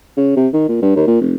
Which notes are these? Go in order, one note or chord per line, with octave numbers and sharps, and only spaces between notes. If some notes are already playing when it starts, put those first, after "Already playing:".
C#3
C3
D#3
A#2
G2
D#2
A#2
F1